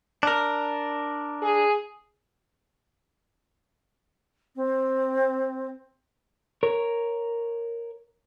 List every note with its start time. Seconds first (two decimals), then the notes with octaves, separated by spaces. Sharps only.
0.23 D4 A#4
1.42 G#4
4.55 C4
6.63 A#4 C#5